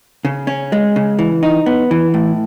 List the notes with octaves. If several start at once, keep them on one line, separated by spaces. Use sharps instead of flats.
C#3
C#4
G#3
C#3
E3
D#4
B3
E3
A2